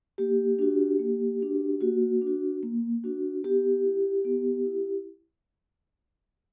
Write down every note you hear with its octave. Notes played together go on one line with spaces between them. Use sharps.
A#3 G4
D4 F#4
A#3
D4 F#4
A#3 F#4
D4
F#4
A#3
D4 F#4
B3 G4
E4
B3
E4